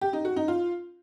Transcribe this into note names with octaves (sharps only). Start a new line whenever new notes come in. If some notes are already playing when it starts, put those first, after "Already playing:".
G4
D#4
F#4
D#4
F4